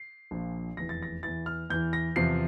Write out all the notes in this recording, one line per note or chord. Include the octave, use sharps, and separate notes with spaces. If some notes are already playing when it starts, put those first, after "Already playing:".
Already playing: C7
A#1 A#2 F3
F1 E2 E3 A#6
A6
A#6
E2 E3 A6
F6
E2 E3 G6
A#6
E2 C3 F3 C7